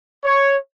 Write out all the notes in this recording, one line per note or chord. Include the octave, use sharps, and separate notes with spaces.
C#5